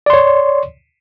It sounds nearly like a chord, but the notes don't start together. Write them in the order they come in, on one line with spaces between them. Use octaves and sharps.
D5 C6 C#5